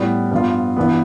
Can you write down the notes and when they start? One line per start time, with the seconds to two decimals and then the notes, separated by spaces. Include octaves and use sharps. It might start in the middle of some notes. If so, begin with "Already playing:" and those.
Already playing: A2 G3 B3
0.31 G2 F3 B3 F4
0.76 G2 E3 B3